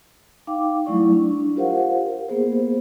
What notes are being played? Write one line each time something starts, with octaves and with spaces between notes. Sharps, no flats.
D#4 F5 G5 D6
F#3 G3 A3 E4 D5 C#6
D4
F4 G4 A#4 C5 F5 F#5
A#4
A#3 B3 G#4 C5